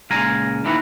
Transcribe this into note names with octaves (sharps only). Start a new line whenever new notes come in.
C#2 A#2 G#3 F5 G#5 A#5
D#3 E3 A#3 E4 F#4